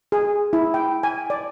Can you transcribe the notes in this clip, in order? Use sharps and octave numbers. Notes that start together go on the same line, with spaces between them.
G#4
E4
G5
G#5
D5